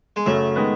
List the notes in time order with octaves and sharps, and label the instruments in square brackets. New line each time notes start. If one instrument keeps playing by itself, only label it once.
[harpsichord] G#3
[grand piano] F#2 C#3 F#3 C#4 [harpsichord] A3
[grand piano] D#3 G#3 B3